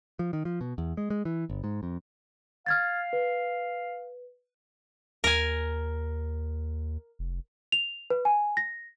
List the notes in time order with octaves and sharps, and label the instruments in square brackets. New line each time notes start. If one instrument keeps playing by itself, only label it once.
[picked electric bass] F3
D#3
F3
B2
E2
G#3
G#3
E3
G1
G#2
F2
[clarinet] F5 [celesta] F6 G#6 A6
[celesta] B4
[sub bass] D#2 [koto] A#4 G#5
[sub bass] F1
[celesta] F7
B4
G#5
A#6